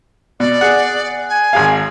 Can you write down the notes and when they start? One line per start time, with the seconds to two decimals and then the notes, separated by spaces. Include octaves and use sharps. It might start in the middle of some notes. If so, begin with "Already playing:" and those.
0.40 B2 D5
0.61 G#4 F#5
1.29 G#5
1.53 G#1 G#4 F5